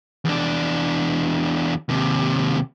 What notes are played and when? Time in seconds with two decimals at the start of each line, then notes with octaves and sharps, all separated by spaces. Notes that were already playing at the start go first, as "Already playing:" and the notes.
0.25 E2 D4
1.89 D#2 C3